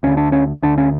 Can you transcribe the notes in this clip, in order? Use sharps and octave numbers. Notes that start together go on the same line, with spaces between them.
D2 D3 C#4
D4
C#4
D2 D3 D4
C#4